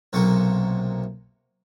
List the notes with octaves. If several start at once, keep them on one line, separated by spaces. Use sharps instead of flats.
B1 C3 F#3 A#3 A4 C#6